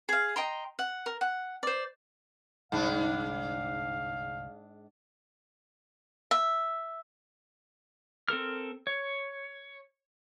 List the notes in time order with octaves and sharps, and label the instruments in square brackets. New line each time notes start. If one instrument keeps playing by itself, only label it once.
[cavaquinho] G#4 F5
D#5 G5 A#5 C6
F#5
A#4
F#5
C5 D5
[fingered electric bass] G1 C2 [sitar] G#2 D4 [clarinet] F5
[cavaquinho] E5
[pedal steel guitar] C4 A4 A#4 F6
C#5